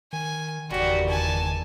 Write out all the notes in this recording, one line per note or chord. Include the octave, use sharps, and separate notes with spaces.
D#3 G#5
F#1 E2 D#3 G3 F#4 G4 D5
G#5 A5